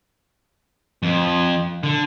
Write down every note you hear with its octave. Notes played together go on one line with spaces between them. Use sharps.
F2
D3